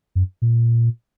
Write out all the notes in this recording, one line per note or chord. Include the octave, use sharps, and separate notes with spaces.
F#2
A#2